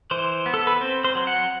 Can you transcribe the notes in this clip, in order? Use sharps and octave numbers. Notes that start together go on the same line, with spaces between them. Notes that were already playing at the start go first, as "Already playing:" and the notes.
E3 C5
B3
A4
B4
C4 C5
C5
F#3
F#5